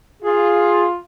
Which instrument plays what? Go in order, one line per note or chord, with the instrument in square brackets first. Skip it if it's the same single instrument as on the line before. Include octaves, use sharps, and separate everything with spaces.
[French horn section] F4 [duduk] G#4